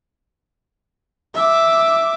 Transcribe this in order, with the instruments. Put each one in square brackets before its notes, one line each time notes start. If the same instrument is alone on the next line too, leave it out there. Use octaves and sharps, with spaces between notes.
[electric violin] E5 D6